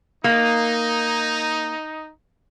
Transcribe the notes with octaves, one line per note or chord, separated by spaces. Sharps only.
A#3 D#4